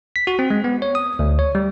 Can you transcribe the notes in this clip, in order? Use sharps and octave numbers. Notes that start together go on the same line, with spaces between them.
B6
F#4
C4
G#3
B3
C#5
D#6
D2
C#5
G3